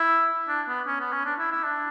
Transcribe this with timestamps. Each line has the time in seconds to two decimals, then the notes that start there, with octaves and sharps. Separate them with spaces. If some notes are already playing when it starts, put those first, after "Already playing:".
Already playing: E4
0.48 D4
0.68 B3
0.87 C#4
1.00 B3
1.12 C#4
1.25 D4
1.39 E4
1.52 E4
1.64 D4